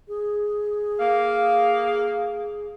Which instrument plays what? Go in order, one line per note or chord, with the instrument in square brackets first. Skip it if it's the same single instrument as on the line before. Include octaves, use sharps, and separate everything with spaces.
[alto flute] G#4
[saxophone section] A#3 F5